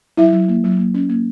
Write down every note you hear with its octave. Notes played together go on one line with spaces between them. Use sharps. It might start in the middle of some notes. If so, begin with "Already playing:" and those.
F#3 E4 E5
F#3
A#3
F#3
A#3
C#4
A#3